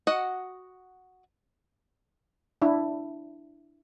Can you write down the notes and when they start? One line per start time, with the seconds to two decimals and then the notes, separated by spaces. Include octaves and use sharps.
0.07 F#4 D#5 F#5
2.62 D4 E4